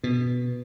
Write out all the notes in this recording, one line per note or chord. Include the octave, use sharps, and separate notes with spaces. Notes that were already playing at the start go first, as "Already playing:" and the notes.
B2